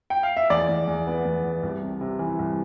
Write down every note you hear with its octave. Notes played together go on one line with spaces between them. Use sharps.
G5
F5
E5
E2 D5
E2
E2
B3
E2
E2
C2
C3
C3
E3
C2